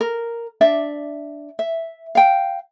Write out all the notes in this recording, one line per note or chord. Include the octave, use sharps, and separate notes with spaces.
A#4
D4 D5 E5
E5
F5 G5